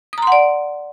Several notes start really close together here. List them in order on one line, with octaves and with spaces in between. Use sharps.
D#6 A#5 C6 F#5 D5